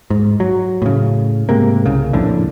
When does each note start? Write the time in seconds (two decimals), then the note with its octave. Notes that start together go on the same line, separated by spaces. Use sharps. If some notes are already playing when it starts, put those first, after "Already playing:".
0.10 G#2
0.40 F#3
0.82 A2 C#3
1.49 G#2 C3 A#3
1.86 C2 C#3
2.13 A#1 F2 A2 D3